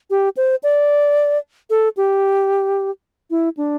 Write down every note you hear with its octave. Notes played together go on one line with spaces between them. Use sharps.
G4
C5
D5
A4
G4
E4
D4